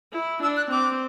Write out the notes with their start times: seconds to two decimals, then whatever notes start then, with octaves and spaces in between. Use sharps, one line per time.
0.13 E4
0.43 D4 E6
0.57 F#6
0.71 C4 D6